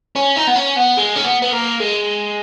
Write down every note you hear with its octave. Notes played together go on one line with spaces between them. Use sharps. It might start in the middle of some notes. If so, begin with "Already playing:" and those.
C#4
D#4
B3
C#4
B3
G#3
C#4
B3
B3
A#3
G#3